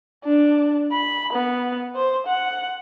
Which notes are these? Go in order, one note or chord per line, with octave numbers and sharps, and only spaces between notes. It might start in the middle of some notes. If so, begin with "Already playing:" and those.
D4
B5
B3
C5
F#5